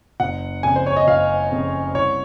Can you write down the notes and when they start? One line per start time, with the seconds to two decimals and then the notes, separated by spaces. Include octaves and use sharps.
0.20 F#1 F#5
0.63 F2 C#3 G#5
0.76 C5
0.86 C#5
0.96 D#5
1.07 F#1 F5
1.51 F2 C#3
1.94 C2 C#5